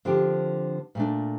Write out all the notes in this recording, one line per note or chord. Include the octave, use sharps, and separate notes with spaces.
D3 F3 C4 G4
A#2 A3 D4